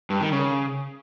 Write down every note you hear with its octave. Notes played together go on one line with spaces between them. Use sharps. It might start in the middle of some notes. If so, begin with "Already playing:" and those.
G2
D#3
C#3